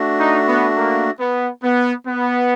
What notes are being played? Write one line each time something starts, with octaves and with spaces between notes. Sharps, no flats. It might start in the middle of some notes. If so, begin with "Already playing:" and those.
Already playing: A3 D4 F#4
D#4
B3
A#3
B3
B3
B3